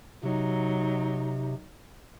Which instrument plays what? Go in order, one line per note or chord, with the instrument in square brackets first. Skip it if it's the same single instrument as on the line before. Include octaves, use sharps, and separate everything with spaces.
[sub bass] C3 [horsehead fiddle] F#3 D#4